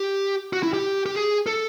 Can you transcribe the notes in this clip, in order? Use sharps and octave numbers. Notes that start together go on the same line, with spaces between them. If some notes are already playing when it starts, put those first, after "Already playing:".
Already playing: G4
F#4
E4
G4
G4
G#4
A4